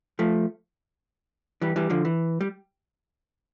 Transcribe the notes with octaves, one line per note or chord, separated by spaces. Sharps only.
F3 A3
E3 G3
E3 G3
D3 F3
E3
G3